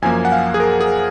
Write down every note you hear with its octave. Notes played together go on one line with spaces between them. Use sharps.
F#2 F3 A#3 G#5
F#5
F5
G#4
A#4
G#4